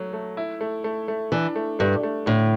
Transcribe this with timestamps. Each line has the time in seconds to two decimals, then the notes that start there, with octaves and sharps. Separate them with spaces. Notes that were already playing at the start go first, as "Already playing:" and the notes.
Already playing: F#3 A3
0.13 A3
0.37 E4
0.61 A3
0.84 A3
1.08 A3
1.32 E3 D4
1.56 A3
1.79 G2 A3
2.03 A3
2.26 A2 D3